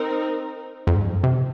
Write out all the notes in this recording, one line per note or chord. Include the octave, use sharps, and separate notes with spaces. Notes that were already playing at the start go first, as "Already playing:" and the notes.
Already playing: C4 D#4 A#4
F2
G#2
F#2
C3